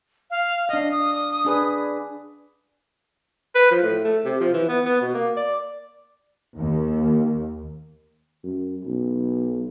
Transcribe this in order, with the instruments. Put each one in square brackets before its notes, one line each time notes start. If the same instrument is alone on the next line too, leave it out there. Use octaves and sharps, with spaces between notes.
[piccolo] F5
[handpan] D4 F5 [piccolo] D#5
[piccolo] D#6
[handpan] D4 G#4 B4
[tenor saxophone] B4
F3
A2
A3
C3
F3
E3
B3
B3
B2
A#3
D5
[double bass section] D#2
[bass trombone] F#2
B1